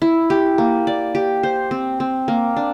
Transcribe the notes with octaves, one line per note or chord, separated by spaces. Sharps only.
E4
G4
A#3
D5
G4
C5
C4
C4
A#3
D4